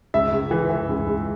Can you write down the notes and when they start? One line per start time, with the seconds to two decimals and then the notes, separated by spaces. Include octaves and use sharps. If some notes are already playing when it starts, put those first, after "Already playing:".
0.14 C#2 E5
0.32 C#2
0.51 E3
0.69 E3
0.89 C#2
1.07 C#2